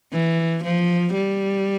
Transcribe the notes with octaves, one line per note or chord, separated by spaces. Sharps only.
E3
F3
G3